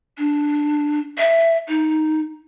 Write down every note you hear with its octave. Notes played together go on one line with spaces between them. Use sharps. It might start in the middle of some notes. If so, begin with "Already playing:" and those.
D4
E5
D#4